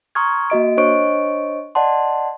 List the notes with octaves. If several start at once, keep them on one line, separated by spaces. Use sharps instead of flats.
A#5 C6 C#6 D#6 F6 G#6
A#3 F#4 D#5 D7
D4 C5 C#5 D#5 C#6 D7
D5 D#5 F#5 A5 C6